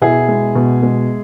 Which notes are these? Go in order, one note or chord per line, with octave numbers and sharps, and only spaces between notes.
B2 E4 G#4
G#3
B2
G#3